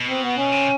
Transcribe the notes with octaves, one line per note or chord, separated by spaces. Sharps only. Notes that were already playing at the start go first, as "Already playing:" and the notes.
Already playing: B2
C4
B3
C#4
C3